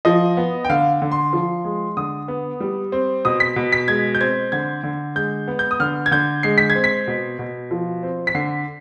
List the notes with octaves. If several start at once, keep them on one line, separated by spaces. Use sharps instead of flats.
F3 D#5
B3
G5
D3 F5
D3
C6
F3
G#3
D3 D#6
B3
G3
C4
B2 D#6
B6
B2
B6
G#3 G#6
G6
C4 G#6
D3 G#6
D3
G#3 G6
B3
G6
D#6
D3 F6
G#6
D3 G6
G#3 C7
B6
G#6
C4
B6
B2
B2
F3
C4
B6
D3 C7